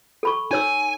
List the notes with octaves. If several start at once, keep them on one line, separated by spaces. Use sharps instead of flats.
A4 B5 C#6
D#4 C#5 G#5 E6